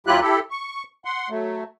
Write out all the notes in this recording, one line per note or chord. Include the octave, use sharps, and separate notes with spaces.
D#2 F#3 E4 F4 G4 F#6
E4 G4 A4
C#6
F#5 C6
F#3 A3